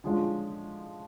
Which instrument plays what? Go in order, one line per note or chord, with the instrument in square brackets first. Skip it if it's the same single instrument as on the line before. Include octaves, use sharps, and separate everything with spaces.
[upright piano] D3 F3 G#3 C#4 F4